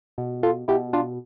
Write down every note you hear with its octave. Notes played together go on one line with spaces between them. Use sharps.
B2
F4 A4
B2 E4 G4
D4 F4